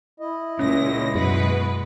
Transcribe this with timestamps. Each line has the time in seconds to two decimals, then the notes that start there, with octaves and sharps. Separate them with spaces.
0.20 E4 D#5
0.59 C#2 A#2 C#4 A#6
1.15 F#2 B2 G#3 B4